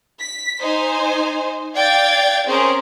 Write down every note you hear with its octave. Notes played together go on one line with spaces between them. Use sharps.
B6
D#4 C5 G#5
D5 F5 G5 G#6 A6
C4 C#4 G#4 A#4 C5